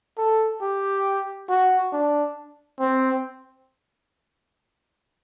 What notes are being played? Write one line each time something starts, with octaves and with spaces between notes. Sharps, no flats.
A4
G4
F#4
D4
C4